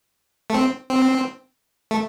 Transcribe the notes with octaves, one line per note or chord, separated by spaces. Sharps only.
A3
C4
C4
A3